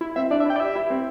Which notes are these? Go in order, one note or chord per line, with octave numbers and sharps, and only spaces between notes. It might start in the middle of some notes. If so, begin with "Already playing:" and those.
E4
C4 E5
D4 D5
E5
E4 G5
D5
G4 E5
E4
C4